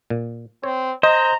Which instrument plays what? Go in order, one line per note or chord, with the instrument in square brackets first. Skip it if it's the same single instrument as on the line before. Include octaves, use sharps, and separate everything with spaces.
[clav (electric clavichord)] A#2
[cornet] C4 [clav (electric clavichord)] C#5
[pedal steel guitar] C5 [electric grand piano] D#5 [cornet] A#5